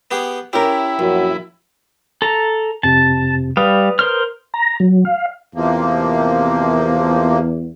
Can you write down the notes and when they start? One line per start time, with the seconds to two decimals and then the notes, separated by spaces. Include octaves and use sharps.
0.11 B3 G4 G#4
0.53 C#4 E4 G4 A#4
0.99 A#1 F#2 F#4
2.22 A4 A#5
2.83 F2 C3 A5
3.57 G3 B4 F5 D#6
3.99 A#4 C5 F6
4.54 A#5
4.80 F#3
5.05 F5
5.55 E2 C3 F3 A#3